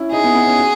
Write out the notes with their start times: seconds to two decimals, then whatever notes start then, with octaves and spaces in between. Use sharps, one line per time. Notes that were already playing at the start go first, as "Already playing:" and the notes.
Already playing: C#4 E4
0.12 D#4 G#4
0.24 B3
0.35 B3
0.47 C#4
0.58 F#4